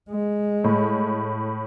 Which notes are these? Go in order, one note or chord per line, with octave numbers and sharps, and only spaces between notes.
G#3
A2